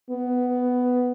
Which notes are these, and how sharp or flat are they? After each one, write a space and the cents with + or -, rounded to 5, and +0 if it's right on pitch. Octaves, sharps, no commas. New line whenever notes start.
B3 +10